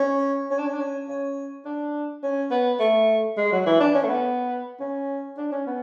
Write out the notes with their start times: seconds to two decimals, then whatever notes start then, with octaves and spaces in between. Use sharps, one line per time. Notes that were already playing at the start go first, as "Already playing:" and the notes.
Already playing: C#4
0.51 C#4
0.59 D4
0.67 C#4
0.73 D4
0.80 C#4
1.09 C#4
1.65 D4
2.24 C#4
2.51 B3
2.80 A3
3.38 G#3
3.52 F#3
3.66 E3
3.80 D4
3.94 C#4
4.04 A3
4.09 B3
4.80 C#4
5.38 D4
5.52 C#4
5.67 B3